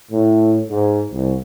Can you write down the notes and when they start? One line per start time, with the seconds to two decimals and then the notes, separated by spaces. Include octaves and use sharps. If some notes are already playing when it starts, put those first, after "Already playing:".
0.11 A2
0.69 G#2
1.11 C2